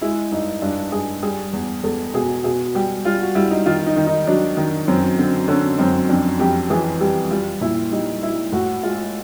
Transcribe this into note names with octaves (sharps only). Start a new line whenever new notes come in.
G#3 E4
G2 D#4
G2 D4
G2 G#4
G3 G#4
E2
E2 A4
B2 G#4
B2 G#4
G3 G4
G3 F4
F#4
G3 E4
D#4
D#3 F4
D#4
D#3
D#4
F#3 D4
D#3
F#2 C4
D3 C4
D3 C#4
F#2 C4
F2 D4
F2 G4
E3 G#4
G3 G4
G3 F4
A#2 E4
G3 D#4
G3 E4
A2 F#4
G#3 F4